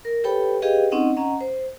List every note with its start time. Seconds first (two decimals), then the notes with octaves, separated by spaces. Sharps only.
0.05 A#4
0.24 G4 A4 B4 C#5 G5 B5
0.62 G4 G#4 B4 D#5 F5 G5
0.92 C4 C#4 D#4 D#5 F#5
1.17 C#4 D#5 F#5 A#5
1.41 C5